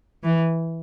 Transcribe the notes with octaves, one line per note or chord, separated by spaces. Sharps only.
E3